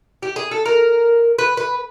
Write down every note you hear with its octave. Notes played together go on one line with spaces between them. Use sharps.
G4
G#4
A4
A#4
B4
B4